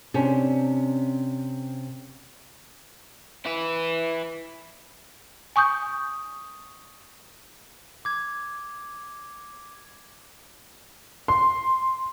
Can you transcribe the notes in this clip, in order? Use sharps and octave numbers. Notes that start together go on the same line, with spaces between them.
C3 C#4 D4
E4 B4
G#5 C#6 D#6 G6
D6 G#6
C6